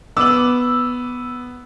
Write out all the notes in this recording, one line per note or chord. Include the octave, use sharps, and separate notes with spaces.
B3 D6 E6 F#7